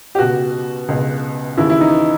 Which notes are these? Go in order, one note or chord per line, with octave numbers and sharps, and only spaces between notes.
G4
C#2 B2 F#4
C#2 B2
D#2 C#3 E3 E4
E4
D#4